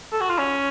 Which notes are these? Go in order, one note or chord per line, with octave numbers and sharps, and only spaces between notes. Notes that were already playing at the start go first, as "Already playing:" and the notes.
A4
F#4
F4
C#4